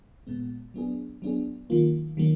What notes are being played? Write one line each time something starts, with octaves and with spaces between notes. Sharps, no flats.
A#2 G#3 B3
F#3 B3 D4 G#4
F#3 B3 D4 G#4
D#3 F#3 A#3 F4
D#3 F#3 A#3